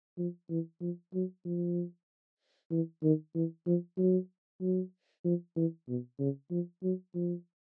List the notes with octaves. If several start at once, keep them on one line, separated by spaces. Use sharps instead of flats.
F3
E3
F3
F#3
F3
E3
D#3
E3
F3
F#3
F#3
F3
E3
B2
C#3
F3
F#3
F3